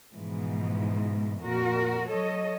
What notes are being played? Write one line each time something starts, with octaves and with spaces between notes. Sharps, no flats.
G#2 B2 E3 F3
F2 A#2 F#4 A#4
F#3 A4 C#5 D#5